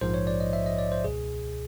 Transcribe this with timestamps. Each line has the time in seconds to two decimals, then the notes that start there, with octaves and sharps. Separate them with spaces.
0.01 A#1 G#2 F3 C5
0.14 C#5
0.27 D5
0.40 D#5
0.53 E5
0.66 D#5
0.79 D5
0.92 C5
1.04 C#2 B2 G#4